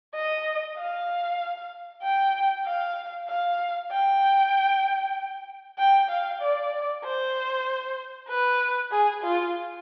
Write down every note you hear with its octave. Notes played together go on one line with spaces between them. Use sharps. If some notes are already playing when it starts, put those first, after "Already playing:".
D#5
F5
G5
F5
F5
G5
G5
F5
D5
C5
B4
G#4
F4